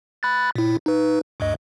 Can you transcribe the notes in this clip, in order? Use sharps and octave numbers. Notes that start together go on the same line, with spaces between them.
B5 F#6 A6
A#2 E4
D#4 B4
D2 G2 D#5